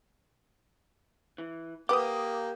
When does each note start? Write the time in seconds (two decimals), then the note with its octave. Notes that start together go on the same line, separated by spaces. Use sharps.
1.38 E3
1.89 A#3 G4 B4 F#5 D6 D#6